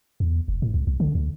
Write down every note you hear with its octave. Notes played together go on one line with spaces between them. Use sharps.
E2
F1
A2
C#2
C2
D3
D2